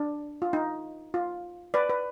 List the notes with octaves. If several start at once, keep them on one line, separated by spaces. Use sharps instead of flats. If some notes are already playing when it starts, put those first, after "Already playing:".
Already playing: D4
F4
D#4
F4
B4 D5
B4